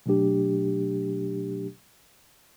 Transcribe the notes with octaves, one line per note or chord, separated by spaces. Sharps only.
B2 F#3 A3 D4 G4